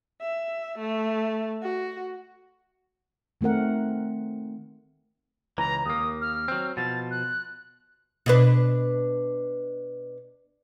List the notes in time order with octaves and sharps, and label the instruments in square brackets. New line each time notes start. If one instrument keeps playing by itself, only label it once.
[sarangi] E5
A3
F#4
[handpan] D#3 A3 C4 A#4 F#5
[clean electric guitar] C#2 E3 [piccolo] A#5
[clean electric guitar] D#2 A#3 [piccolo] D#6
[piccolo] F6
[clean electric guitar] F#3 C4
[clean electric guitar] B2 F3 [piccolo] A6
[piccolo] F#6
[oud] B2 D4 B4